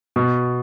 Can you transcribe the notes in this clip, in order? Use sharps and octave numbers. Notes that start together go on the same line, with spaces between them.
B2